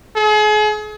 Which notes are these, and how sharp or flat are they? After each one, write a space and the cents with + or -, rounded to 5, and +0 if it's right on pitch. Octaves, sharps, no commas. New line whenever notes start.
G#4 +40